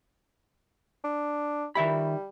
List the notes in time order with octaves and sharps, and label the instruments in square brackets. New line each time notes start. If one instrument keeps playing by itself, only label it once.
[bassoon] D4
[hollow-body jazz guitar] D#3 E5 B5 [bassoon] G3